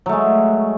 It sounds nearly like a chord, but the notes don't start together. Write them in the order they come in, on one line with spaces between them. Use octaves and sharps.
F#3 A3 G#3